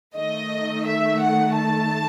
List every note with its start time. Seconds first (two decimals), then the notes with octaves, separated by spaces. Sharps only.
0.16 D#3 A3 D#5
0.86 E5
1.21 F#5
1.57 A5